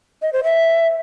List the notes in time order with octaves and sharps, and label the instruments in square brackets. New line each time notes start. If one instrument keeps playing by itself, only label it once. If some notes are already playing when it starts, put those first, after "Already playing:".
[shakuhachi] D#5
C5
E5